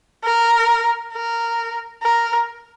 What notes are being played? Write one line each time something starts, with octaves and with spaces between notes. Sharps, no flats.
A#4
A#4
A#4